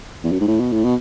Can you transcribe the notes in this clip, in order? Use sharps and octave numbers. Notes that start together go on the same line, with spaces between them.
E2
F#2
G#2
A2
B2
A2
B2